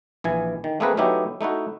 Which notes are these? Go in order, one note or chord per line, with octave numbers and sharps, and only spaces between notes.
A#1 E3 G#5
D#3
A3 A#3 C4 G#4 A#4 B4
F#3 A3 B3 D#4 E4 G4
A3 D#4 E4 F#4